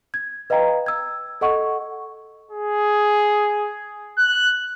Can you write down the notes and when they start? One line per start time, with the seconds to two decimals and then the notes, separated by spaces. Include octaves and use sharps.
0.14 G#6
0.50 B4 D#5 F5 G5 A#5
0.86 E6 G#6
1.41 A4 D#5 F#5 C#6
2.51 G#4
4.18 F#6